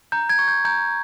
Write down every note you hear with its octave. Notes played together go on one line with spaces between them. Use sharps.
A#5 G6
G#6
C#6
G6
A#5 G6